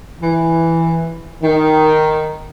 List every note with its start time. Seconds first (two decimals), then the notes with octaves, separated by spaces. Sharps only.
0.21 E3
1.42 D#3